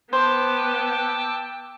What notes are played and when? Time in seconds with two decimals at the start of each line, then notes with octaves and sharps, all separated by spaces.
0.13 B3 C5 G5 A5 D6 E6